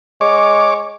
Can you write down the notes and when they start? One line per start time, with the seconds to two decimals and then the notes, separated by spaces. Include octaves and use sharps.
0.21 G#3 C#5 D6